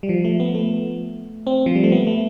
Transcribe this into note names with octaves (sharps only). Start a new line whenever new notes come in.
G3
F3
A3
B3
A3
C4
F3
G3
A3
B3
A3